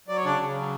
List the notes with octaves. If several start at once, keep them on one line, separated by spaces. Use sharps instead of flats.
F#3 D5
C#5
C#3 D4 D5
C#3
F#3